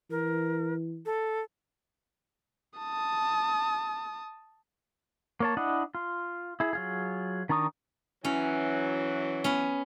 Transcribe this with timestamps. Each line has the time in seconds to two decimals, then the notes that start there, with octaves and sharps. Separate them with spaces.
0.11 E3 A#4
1.06 A4
2.79 A5 D#6
5.40 A#3 C#5 A5
5.57 D4 E4 D#5 F#5
5.95 F4
6.60 E4 G#4
6.73 F#3 F4 G#4
7.49 D#3 D4 A#5 C#6 D#6
8.25 E3 F#3 C#4
9.44 B3 C#4